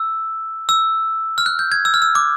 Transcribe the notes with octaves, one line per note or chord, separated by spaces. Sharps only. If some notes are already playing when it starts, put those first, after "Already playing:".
Already playing: E6
E6
F6
F#6
G6
G#6
E6
F6
E6
D6